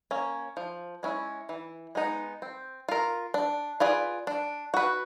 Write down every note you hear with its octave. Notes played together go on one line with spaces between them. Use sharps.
A#3 C#4
F3
G#3 C#4 E4
E3
G#3 B3 D#4
C4
F4 A#4
D4
F4 G#4 B4 D5
D4
F#4 B4